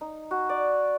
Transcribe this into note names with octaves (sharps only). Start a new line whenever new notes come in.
D#4
F#4
D5